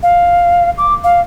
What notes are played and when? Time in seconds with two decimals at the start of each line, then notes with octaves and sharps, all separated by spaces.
0.03 F5
0.78 D6
1.04 F5